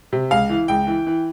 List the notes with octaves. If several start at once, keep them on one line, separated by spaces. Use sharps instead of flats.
C3
C#2 F5
E3
C#2 G5
E3
E3